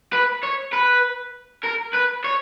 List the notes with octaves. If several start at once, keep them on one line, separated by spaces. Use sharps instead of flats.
B4
C#5
B4
A#4
B4
C#5